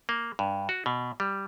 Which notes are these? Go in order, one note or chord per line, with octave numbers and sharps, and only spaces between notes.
A#3
G2
F#4
B2
G3